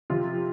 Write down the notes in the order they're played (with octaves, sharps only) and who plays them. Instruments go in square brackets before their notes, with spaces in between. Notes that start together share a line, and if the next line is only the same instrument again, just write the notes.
[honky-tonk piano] C3 F3 F4